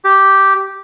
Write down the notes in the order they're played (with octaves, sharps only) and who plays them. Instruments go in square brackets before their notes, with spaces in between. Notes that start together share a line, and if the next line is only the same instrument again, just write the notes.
[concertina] G4